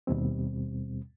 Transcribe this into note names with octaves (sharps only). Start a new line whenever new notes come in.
D#2 B2 G3 C4